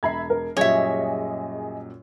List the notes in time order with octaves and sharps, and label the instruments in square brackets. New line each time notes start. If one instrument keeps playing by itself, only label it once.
[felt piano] E1 A#5 C7 [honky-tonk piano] E5 B5 G#6
[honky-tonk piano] A#4
[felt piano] F#2 A#2 G3 [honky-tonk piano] G#4 D#5 [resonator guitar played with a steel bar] C#5 E5